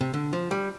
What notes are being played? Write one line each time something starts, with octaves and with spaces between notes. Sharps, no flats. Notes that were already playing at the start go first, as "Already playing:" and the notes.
C3
D3
F3
G3